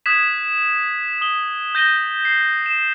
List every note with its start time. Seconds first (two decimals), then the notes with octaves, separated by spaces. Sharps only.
0.06 D#6 F#6 G#6 B6 E7
1.21 D#6 G7
1.75 G6 A#6 D#7 G7
2.25 C7
2.66 E7